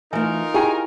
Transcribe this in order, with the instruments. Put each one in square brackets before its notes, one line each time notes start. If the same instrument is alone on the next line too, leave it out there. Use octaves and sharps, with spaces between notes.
[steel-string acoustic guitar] E3 A3 [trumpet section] D#4 F4 A#4 [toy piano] G#5
[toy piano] E4 G4 G5 [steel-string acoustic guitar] G#4 G#5